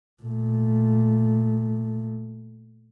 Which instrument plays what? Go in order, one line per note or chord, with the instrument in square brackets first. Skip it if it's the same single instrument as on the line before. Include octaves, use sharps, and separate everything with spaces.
[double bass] A#2 A3